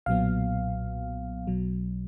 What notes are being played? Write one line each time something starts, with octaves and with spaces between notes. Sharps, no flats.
B1 A#2 F#3 B3 F5
B1 B2 F#3